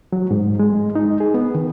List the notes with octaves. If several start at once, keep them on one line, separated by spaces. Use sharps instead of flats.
F#3
G#2
G#3
D#4
G#4
B3
D#3